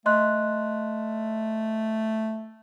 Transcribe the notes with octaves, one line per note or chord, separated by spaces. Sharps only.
A3 D#5 C6 F#6